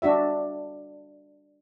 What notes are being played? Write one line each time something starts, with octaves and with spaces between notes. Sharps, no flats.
D4 F#4 E5